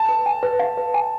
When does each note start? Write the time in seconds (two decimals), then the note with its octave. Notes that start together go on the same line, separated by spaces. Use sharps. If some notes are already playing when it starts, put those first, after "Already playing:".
Already playing: A5
0.09 B4
0.26 G#5
0.43 B4
0.59 F5
0.77 B4
0.94 G#5